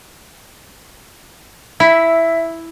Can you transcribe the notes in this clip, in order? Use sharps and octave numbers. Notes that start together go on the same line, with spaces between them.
E4 E5